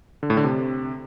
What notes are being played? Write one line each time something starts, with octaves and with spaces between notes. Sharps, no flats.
D3
A2
D3
C3